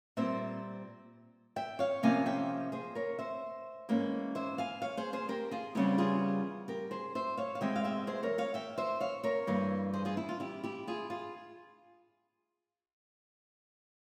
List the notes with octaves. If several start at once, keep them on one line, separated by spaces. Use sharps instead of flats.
A#2 G3 C4 C5 E5
E5 G5
C#5 F5
C3 F3 A#3 C#4 F5 G#5
E5 G5
G#4 C5
A#4 C#5
C5 E5
G#2 E3 A#3 C#4
C5 E5
F5 G#5
C#5 F5
G#4 C5
G#4 C5
G4 A#4
F4 G#4
E2 C#3 G3 C4 E4 G4
F4 G#4
G4 A#4
G#4 C5
C5 E5
C#5 F5
F5
E2 C3 E3 G#3 C4 E5 G5
F5
E5 G5
G#4 C5
A#4 C#5
C#5 F5
E5 G5
C5 E5
C#5 F5
A#4 C#5
G2 E3 A#3
G#4 C5
F4 G#4
E4
F4
E4 G4
E4 G4
F4 G#4
F4 G#4